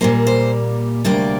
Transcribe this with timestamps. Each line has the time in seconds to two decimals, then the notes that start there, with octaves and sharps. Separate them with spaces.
0.01 A#2 G3 A#3 C5
0.27 C5
1.04 D2 C3 G3 A#3 D5